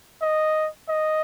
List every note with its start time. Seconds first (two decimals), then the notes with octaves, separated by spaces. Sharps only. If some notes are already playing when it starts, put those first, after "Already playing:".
0.22 D#5
0.89 D#5